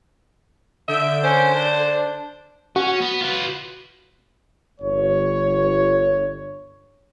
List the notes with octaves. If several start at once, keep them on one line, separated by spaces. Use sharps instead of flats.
D3 E5 G6 D7
C#4 C5
D4
C#4 F#4
B3
F4 B4
G1 C#5